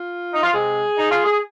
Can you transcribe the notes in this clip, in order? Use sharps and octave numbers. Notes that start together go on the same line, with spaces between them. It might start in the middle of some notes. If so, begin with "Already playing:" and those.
Already playing: F4
D#4
F4
C3 G#3 C4 G#4
D#4
F4
G#4